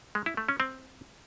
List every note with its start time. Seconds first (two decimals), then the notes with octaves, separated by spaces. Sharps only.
0.15 G#3
0.26 E4
0.37 A3
0.49 C#4
0.60 C4